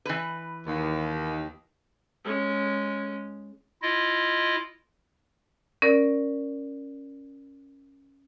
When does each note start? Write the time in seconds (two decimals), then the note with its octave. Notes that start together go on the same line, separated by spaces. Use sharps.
0.05 E3 B4
0.66 D#2
2.24 G#3 C#4
3.82 E4 F4 D#5
5.82 C#4 A#4 D5